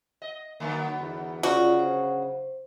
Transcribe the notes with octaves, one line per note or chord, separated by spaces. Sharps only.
D#5
D3 F#3 A#3 B3
E2
C#3 F4 F#4 D5
C5